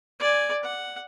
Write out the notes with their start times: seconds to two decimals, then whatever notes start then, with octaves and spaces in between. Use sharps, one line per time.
0.19 D5 G#5
0.63 F#5